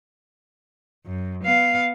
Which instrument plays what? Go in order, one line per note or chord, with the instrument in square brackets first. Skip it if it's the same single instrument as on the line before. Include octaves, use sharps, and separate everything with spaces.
[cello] F#2
B3 F5